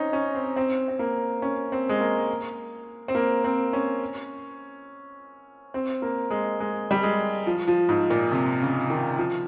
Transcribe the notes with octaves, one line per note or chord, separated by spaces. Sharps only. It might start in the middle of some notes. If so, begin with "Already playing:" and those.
Already playing: C4 C#4 D#4
C#4
C4
C4
C4
A#3
C#4
C4
G#3
A#3
C4
A#3
C4
C#4
C4
A#3
G#3
G#3
G3
G#3
F3
F3
G#2
A#2
C3
C#3
D#3
F3